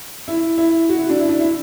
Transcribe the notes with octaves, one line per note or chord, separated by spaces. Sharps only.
E4
E4
F#4
E4
D4
E4
D4
E4